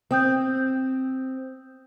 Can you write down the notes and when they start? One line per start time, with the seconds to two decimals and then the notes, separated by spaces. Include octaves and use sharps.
0.11 C4 G5 D#6 G6